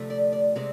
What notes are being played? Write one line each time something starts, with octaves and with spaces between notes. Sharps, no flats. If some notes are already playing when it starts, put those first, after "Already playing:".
Already playing: D2 C3 F3 A3
D5
D5
C3 G#3 C4 D5